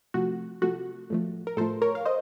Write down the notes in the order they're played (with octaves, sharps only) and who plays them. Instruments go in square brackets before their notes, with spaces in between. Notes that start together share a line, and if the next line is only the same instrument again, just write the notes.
[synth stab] C3 F3 A3 F#4
C3 F3 A3 F#4
A2 F3 A3
A#4
A2 F3 A3 A4 C5
A#4 C#5
F5
C5 D#5